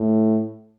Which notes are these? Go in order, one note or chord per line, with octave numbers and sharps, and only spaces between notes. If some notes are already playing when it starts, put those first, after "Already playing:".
Already playing: A2